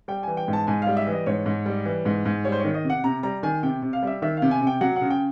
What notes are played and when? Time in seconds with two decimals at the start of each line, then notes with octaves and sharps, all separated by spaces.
0.08 G3 G5
0.23 E3 G#5
0.37 G5
0.48 G#2
0.53 A5
0.67 G#2 G#5
0.82 G3 F5
0.97 E5
1.07 E3
1.12 D#5
1.26 G#2 C#5
1.46 G#2
1.66 G3
1.85 E3
2.05 G#2
2.25 G#2
2.45 G3 C#5
2.52 C5
2.60 D#3 C#5
2.74 D#5
2.84 C3
2.90 F#5
3.04 C3 A#5
3.23 G3 A#5
3.43 D#3 G#5
3.63 C3 G5
3.82 C3
3.93 F5
4.03 G3 E5
4.22 D#3 E5
4.37 F5
4.42 C3
4.51 G#5
4.61 C3
4.67 G5
4.81 F#3 F#5
4.96 C#3 F#5
5.10 G5